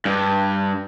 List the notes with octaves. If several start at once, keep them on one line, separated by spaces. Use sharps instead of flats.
G2